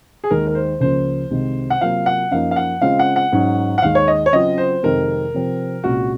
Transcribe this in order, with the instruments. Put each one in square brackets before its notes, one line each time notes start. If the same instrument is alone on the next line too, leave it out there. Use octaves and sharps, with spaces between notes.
[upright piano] G#4
[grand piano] D#2 D#3 G#3 [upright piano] A#4
[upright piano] A#4
C5
[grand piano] C#2 C#3 F3 A#3 [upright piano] C5
[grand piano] C2 C3 D#3 G#3
[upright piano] F#5
[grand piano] C3 F#3 A#3 F4 [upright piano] F5
[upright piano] F#5
[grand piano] F#2 F3 A#3 D#4 [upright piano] F5
[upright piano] F5
F#5
[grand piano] C#3 G#3 C4 F4 [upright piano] F5
[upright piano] F#5
F#5
[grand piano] G#2 F#3 C#4
[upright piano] F#5
[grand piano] D#2 D#3 G#3 [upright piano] F5
[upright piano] C#5
D#5
C#5
[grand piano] C#3 F#3 C4 F4 [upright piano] D#5
[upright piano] C5
[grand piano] F2 C3 D#3 G#3 C4 [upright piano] A#4
[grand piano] C3 F3 C4
[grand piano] C2 A#2 G#3 C#4 F4 [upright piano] F#4